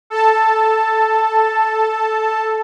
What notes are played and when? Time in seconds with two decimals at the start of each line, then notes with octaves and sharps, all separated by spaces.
0.10 A4 A5